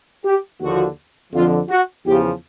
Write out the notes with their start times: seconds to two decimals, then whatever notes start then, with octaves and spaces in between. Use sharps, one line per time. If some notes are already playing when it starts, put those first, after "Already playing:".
0.24 G4
0.60 D#2 D3 F3 F#4
1.32 F2 D3 F3 F4
1.69 F#4
2.05 E2 C#3 F3 G4